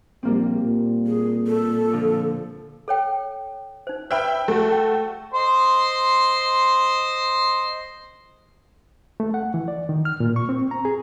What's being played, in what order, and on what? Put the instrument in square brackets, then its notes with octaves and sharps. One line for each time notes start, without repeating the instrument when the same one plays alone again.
[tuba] A#1 [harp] G3 A#3 C4
[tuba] A#2
[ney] G#4
A4
[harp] D3 F3 D4
[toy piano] A4 C#5 G5
D#4 C5
[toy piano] B4 C5 D5 [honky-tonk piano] E5 G5 B5
[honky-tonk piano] A3 F#4 [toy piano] G#4
[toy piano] G5
[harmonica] C5 D#5 C6
[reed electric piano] A3
F#5
E3
D5
D#3
F6
A#2
C#6
C4
A#5
G#4